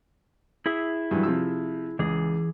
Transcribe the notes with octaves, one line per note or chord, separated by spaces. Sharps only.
E4 G#4 E5
G2 E3 F#3
C3 F3 E6
C#2 E3 G#4